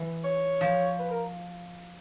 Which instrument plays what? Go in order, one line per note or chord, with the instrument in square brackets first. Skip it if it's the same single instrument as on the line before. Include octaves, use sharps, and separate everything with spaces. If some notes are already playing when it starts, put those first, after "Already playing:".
Already playing: [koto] E3
[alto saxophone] C#5
[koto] F3
[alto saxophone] B4
A#4